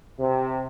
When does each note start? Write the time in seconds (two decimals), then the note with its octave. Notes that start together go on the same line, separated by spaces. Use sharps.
0.18 C3